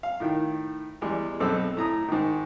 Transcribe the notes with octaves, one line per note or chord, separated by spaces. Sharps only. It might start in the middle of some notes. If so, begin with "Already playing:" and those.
F5
A2 D#3
E2 G3 G#3
B1 B2 C4 A4 E6
A2 A#5 D#6
G#2 D#3